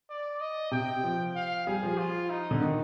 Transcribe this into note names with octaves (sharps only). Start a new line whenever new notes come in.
D5
D#5
C3 G5
F3
F5
G3 G#4
F3
F4
D#4
D3
D#3